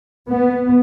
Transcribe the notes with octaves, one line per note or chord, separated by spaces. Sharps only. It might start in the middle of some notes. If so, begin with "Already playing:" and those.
B3